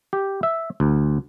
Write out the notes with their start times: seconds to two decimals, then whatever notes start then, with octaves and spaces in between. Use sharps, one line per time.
0.13 G4
0.43 E5
0.80 D2